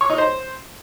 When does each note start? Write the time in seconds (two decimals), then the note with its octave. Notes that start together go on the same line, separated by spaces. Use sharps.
0.01 C#5
0.10 D#4
0.18 C5